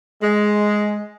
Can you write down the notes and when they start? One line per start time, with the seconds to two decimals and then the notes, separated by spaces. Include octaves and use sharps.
0.21 G#3